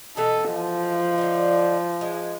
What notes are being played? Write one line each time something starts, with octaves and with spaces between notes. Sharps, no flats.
B2 E3 A4 D#5
F3
D3 D#4
G#3